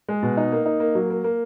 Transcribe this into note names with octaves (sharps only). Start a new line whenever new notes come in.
G#3
B2
D#4
A#3
D#4
A#3
F#3
A#3
A#3